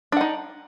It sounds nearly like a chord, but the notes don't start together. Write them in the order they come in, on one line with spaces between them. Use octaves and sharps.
D4 F#5 D#4